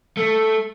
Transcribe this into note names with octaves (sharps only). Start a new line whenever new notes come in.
A3